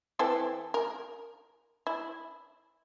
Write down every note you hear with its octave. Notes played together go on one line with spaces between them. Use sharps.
E3 C4 A4
A#4
E4